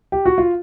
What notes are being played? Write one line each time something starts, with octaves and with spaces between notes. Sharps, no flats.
G4
F#4
F4